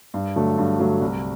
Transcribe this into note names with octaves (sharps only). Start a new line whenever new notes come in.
G2
D3 F#3 A3
G2
D3 F#3 A3
C2